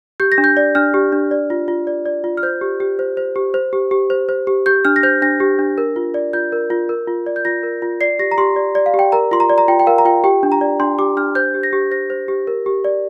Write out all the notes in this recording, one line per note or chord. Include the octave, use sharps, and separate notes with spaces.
G4 G6
A#6
D4
G6
D5
D4 F6
G4
D4
D5
F4
F4
D5
D5
F4
F6
C5 G6
G4
G4
C5
C5
G4
C5
G4
G4
C5
C5
G4
G4 G6
D4 F6
A#6
C5 G6
D4 A#6
G4
D4
A#4
F4
D5
F4 G6
A#4
F4
A#4
F4
D5
G6
F4 A#6
A#4
F4
D5 C7
G4 A#6
A#5
G4 C6
D5
D5
F5
G4
G5
A#4 A#5
F4 C6
A#5
D5
A#5
F4 G5
G5
A#4 F5
A#5
F4 G5
G4 G5
D4
A#5
D5
D4 C6
G4 D6
D4 F6
C5 G6
G4
A#6
G4
C5 A#6
C5
G4
A#4
G4
D5